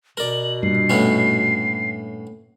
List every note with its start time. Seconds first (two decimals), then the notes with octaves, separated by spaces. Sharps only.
0.17 B2 A#4 D5 F#7
0.63 G2 A#2 C7
0.90 A2 B3 C#4